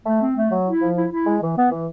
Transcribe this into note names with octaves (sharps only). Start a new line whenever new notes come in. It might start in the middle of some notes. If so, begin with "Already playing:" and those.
A3
C4
A3
F#3
E4
F3
E4
E4
G#3
E3
B3
E3